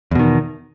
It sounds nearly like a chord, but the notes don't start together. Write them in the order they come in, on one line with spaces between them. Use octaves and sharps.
E2 B2 D#3